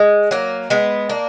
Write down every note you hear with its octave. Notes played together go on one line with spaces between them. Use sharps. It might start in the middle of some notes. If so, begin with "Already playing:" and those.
Already playing: G#3
F#3 A#3
G#3 B3
A#3 D4